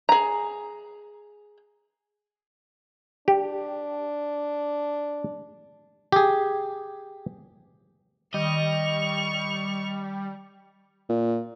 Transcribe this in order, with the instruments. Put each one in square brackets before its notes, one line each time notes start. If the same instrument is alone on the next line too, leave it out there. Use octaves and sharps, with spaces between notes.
[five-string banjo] G#4 A#5
[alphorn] D4 [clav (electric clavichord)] G4
[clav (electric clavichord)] G4 G#4
[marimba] D#3 [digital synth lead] G3 [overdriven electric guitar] D#5 [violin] C#6 F7
[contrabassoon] A#2